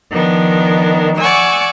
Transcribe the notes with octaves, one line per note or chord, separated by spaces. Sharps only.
D#3 F3 B3 D4
D5 F#5 G#5 C#6 E6